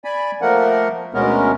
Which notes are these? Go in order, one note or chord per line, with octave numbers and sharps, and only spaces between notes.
D5 G#5 B5
F3 A3 A#3 A#4 F#5
D2 B2 G#3 B3 C#4 A#4